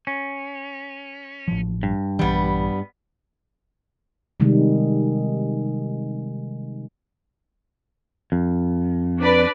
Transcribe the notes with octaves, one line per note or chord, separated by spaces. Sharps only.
C#4
A1 F3
G2
A#1 E3 G3 B3
C3 D#3 G3 G#3
F2
D4 B4 D5